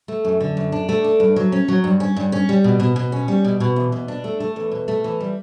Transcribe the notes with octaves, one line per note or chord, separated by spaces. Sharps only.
A3
F#2
D3
F#2
D4
A3
D4
G2
F#3
C#4
F#3
G2
C#4
G2
C#4
G3
B2
B2
B2
C#4
G3
B2
B2
E2
B2
D4
A3
A3
E2
B2
A3
E3
G3